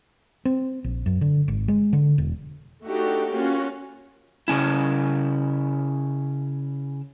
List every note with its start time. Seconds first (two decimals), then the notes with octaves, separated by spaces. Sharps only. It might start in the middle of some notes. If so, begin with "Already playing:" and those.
0.45 C4
0.84 A#1
1.06 F#2
1.21 D3
1.48 G#1
1.68 G#3
1.93 D3
2.18 E1
2.86 A3 D4 D#4 F#4 G4
3.34 A#3 C#4 F4 F#4
4.48 C#3 C#4 E4